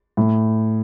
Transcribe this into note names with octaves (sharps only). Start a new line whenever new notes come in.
A2